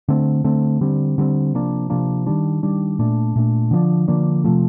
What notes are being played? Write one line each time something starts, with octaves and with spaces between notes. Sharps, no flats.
D3 A3 C4
D3 A3 C4
D3 G3 C4
D3 G3 C4
C3 F3 A#3 D4
C3 F3 A#3 D4
D#3 G3 D4
D#3 G3 D4
A#2 A3 D4
A#2 A3 D4
D3 F3 A#3 D4
D3 F3 A#3 D4
C3 F3 A3